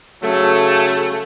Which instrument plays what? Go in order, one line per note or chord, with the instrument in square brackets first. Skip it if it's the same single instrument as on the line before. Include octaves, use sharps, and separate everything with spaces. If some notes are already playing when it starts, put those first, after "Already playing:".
[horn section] C#3 F#3 A3 C#4 A4